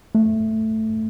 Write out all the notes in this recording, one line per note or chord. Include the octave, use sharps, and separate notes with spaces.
A3